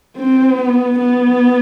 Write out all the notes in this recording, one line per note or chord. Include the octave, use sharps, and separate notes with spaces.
C4
B3
B3